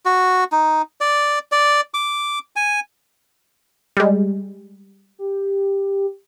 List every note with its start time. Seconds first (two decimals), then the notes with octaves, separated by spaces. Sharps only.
0.05 F#4
0.52 D#4
1.01 D5
1.52 D5
1.94 D6
2.56 G#5
3.97 G3 G#3
5.19 G4